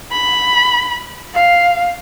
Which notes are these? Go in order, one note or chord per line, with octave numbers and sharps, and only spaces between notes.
B5
F5